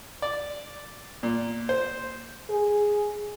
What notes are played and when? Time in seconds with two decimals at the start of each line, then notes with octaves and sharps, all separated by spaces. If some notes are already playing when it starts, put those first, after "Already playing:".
0.22 D5
1.23 A#2
1.69 C5
2.50 G#4